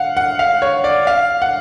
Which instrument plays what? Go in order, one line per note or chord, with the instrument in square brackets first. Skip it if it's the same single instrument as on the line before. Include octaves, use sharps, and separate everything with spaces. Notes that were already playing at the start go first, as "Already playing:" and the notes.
Already playing: [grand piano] F5 F#5
F#5
F5
C#5
D5
F5
F#5